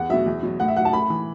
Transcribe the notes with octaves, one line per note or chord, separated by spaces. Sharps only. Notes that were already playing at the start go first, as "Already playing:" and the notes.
Already playing: E2 F#5
B2 F#3 E5
E2
B2 F#3
A2 F#5
E5
F#3 F#5
A5
A2 B5
E3